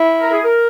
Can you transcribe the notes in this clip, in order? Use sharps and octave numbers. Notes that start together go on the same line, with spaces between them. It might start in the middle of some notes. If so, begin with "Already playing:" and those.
Already playing: E4
A#4
G#4
A#4